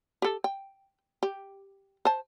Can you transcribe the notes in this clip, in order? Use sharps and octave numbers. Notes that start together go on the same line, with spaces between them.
G4 A4
G5
G4
C5 A5